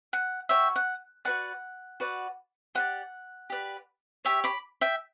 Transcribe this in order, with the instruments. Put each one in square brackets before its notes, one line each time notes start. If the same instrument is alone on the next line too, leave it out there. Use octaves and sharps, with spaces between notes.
[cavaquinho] F#5
F#4 C#5 E5 G5
F#5
F#4 B4 D5 F#5
F#4 B4 D5
G4 B4 D5 F#5
G4 B4 D5
G4 C#5 E5 G5
B5 D6
E5 G5